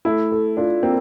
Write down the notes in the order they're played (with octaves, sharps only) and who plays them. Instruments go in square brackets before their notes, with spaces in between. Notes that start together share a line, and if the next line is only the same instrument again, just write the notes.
[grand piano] A3 [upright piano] E4
[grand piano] A4
[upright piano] D4 [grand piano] F4
[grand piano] A#3 [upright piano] C4